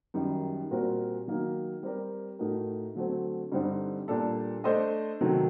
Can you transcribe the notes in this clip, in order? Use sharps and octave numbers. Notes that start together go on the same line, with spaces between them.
F#2 D#3 G3
A#2 G3 C4 F#4 A#4
D#3 F#3 A#3 D#4
G3 C4 G4 A#4 D5
A2 A3 D#4 F#4 A#4
D3 F#3 A3 C4
G2 D3 G3 C4 D#4
A#2 G3 D4 A4
A3 D4 A4 C5 D#5
C3 D#3 F#3 A3